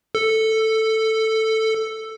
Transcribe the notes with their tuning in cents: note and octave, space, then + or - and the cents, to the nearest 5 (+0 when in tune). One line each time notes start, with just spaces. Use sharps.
A4 +5